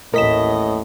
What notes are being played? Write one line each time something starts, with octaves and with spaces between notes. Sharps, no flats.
A1 D#2 A2 A#4 D#5 B6 E7